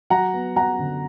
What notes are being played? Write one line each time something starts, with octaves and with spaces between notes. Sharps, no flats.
F#3 F#5 A#5
B3
F#3 F#5 A#5
D3